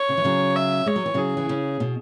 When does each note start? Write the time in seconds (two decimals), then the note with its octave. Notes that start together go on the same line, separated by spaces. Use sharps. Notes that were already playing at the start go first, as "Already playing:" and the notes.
Already playing: C#5
0.09 C#3
0.17 E3
0.24 C#3 F#3
0.56 E5
0.86 G#3 C#5
0.96 F#3
1.06 E3
1.14 C#3 F#3 G#4
1.37 E3
1.49 C#3
1.80 B2